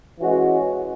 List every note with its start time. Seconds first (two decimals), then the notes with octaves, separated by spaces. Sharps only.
0.20 E3 G#3 C#4 F#4